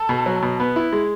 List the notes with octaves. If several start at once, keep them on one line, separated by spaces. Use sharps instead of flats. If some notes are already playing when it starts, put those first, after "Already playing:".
Already playing: A4
B2
F#3
B2
B3
E4
G#3